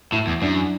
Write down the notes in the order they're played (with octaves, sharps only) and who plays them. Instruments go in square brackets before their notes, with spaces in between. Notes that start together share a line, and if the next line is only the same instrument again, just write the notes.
[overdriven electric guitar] A2 [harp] E4
[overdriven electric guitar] E2
[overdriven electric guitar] F#2 [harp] D4